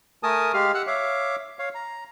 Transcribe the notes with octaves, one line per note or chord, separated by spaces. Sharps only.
A3 A#4 G#5 A5 D#6
G#3 G4 F5 F6
F#5 E6 F#6
C#5 E5 F5 D6
C#5 F5
A#5